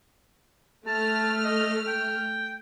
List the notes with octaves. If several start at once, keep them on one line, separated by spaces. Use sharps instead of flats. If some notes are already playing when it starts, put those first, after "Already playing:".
A3 A5 F6
D#5
G5